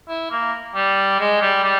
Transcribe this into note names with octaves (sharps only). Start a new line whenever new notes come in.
E4
A#3
G3
G#3
G3
G3